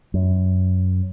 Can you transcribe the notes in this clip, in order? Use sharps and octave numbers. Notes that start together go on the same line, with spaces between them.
F#2